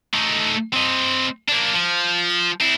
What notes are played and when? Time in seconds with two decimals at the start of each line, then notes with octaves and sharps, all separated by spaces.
0.14 A3 D#4
0.73 C4 D#5
1.49 A#3 D4
1.74 F3
2.61 C4 E4